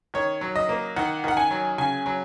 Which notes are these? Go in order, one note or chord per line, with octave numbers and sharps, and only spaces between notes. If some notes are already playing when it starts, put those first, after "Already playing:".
D#3 C#5
F#3
D#5
A#3
D#3 F#5
D#3 F#5
G#5
F#3
C#3 G#5
F#3